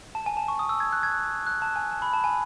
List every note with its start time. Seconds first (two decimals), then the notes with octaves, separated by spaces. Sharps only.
0.15 A5
0.26 G#5
0.37 A5
0.48 C#6
0.59 D#6
0.69 E6
0.80 G#6
0.93 F#6
1.03 G#6
1.47 F#6
1.62 A5
1.76 G#5
1.91 A5
2.02 B5
2.13 A5
2.24 G#5